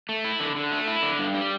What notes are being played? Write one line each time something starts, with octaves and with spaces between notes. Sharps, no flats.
A3
E4
D3
D3
A3
E4
D3
G2
G3